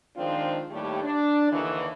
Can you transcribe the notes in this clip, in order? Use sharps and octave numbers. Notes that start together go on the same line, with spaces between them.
D#3 F3 G#3 C4 D4 F4
D#2 A2 G3 A3 G4
D4
D#2 D3 E3